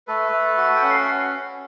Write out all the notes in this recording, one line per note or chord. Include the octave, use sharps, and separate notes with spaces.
A3 A4 B4
A3
F#4
G5
C#4 F#5
F5
E5